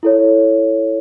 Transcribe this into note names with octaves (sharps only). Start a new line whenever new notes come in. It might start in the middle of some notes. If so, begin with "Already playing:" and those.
E4 A4 C#5